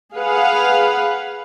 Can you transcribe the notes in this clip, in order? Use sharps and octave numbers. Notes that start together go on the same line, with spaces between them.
G#4 B4 F5 F#5